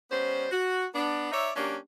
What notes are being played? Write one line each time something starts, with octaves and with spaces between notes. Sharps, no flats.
G3 B3 C#4 C5
F#4
B3 D4
D#4 C#5 D5 E5
F#3 A#3 C#4 D4 G4